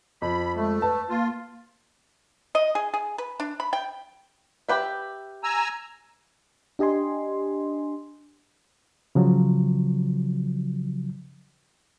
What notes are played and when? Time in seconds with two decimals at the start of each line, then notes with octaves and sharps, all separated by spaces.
0.22 F2 B5
0.56 G#3 A3
0.82 B4 A5
1.09 A#3 F4
2.55 D#5
2.75 G#4
2.94 G#4
3.18 B4
3.40 D4
3.60 B5
3.73 G5
4.68 G4 B4 E5
5.44 G#5 A#5 E6
6.79 D4 G4 D#5 G#5 C6
9.15 C#3 F3 F#3